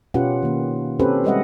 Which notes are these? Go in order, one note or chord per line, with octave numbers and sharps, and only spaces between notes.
B2 C#4 F4 G4 B4 F#5
D#3 A#3
C4 C#4 G4 A4 B4 C5
G3 G#3 B4 D#5 E5 F#5